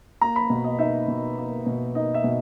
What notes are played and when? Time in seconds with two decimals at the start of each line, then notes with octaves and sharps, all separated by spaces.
0.21 A#3 A#5
0.36 B5
0.50 B2
0.64 D#5
0.79 D#4 E5
1.08 B2
1.38 A#3
1.66 B2
1.95 D#4 D#5
2.14 E5
2.24 B2